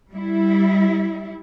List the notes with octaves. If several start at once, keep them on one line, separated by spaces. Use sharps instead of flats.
G3 E4